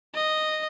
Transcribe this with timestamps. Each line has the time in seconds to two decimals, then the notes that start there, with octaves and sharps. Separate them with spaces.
0.14 D#5